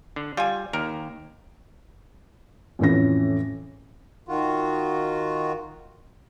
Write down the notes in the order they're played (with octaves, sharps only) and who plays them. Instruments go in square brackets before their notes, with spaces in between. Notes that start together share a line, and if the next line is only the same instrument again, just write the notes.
[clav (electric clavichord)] D3
[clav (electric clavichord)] G3 [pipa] F4 G#5
[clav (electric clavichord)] D#2 [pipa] A#4
[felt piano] F2 A2 E3 C#4 A#6
[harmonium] D#3 F4 F#4